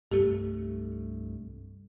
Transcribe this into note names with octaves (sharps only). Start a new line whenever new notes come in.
C2 G2 A3 G4